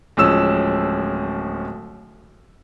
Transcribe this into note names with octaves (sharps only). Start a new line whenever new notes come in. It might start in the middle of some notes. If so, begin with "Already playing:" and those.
D1 F3 G#3 C#4 E6 E7